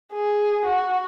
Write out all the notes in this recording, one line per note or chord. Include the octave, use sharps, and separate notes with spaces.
G#4
F#4